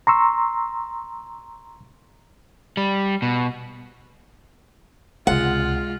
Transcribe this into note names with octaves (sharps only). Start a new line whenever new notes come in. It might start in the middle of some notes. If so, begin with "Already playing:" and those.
A#5 C6 C#6 E6
G3
B2
C#2 C3 G#3 F4 F#5